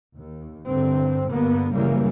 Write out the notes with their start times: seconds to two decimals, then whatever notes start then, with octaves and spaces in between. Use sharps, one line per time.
0.15 D#2
0.66 G2 D3 C4
1.30 G2 D3 A#3 B3
1.74 F#2 C#3 E3 G3 A#3